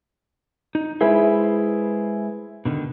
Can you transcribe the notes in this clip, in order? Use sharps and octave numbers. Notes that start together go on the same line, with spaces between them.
D#4
G#3 E4 G#4 B4 C5
B2 D3 D#3